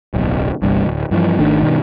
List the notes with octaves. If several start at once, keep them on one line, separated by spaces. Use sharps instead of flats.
D1 B1
G1 C2 G2
D1
G2 E3 F3
G#1 D#3 A3 D4
G2 B2 D#3